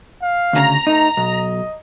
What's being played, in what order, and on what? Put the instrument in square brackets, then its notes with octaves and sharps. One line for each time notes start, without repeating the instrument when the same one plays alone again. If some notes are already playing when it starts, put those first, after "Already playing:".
[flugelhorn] F5
[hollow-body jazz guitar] D2 C#3 [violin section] A#5
[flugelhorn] A3 [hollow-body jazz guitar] D#4
[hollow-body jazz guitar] B1 [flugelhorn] D#5